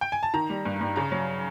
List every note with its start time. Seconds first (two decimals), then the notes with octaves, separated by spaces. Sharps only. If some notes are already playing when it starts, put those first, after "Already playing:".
0.01 G5
0.12 G#5
0.23 A5
0.34 D#3 A#5
0.50 G3
0.65 G2
0.81 G2
0.96 C#3 A#5
1.12 F#3